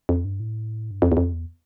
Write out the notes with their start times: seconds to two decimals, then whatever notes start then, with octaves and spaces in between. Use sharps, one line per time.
0.09 F2
0.25 G2
0.40 A2
0.91 G2
1.02 F2
1.12 E2
1.17 F2
1.33 E2